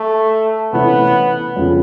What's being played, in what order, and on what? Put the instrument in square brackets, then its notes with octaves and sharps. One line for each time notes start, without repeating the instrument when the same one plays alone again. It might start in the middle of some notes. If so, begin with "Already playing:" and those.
Already playing: [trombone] A3
[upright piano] C3 E3 A3 C#4 E4 [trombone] B3
[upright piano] F2 C#3 F3